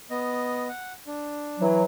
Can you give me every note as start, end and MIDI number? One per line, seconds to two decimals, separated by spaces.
0.10 0.68 59
0.10 0.68 75
0.69 0.93 78
1.07 1.62 62
1.60 1.83 52
1.60 1.83 54